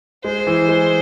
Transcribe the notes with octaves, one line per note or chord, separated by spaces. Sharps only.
G#3 C5
E3
G#3